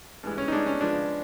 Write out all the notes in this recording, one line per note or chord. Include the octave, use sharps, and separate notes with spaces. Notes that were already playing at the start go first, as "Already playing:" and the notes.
G2 E3 G#3
C#4
D#4
G2 E3 G#3 D4
C#4
C#3 F3 G#3 B3 D4